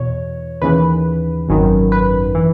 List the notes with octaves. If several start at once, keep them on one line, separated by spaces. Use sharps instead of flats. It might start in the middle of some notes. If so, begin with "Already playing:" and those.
Already playing: E2 B2 C#5
D#2 C#3 E3 B4
G#1 F#2 D#3
B4
E3